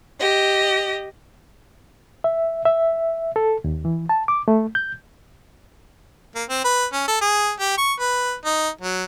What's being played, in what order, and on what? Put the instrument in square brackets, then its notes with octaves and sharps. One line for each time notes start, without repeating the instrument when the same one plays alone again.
[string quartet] G4 D#5
[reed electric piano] E5
E5
A4
D#2
E3
A5
D6
A3
G6
[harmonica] A#3
C4
B4
C#4
A4
G#4
G4
C#6
B4
D#4
F#3